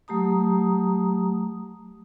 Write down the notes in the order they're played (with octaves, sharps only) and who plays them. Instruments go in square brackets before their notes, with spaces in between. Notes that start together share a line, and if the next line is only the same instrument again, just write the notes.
[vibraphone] F#3 A3 G4 A#5 D#6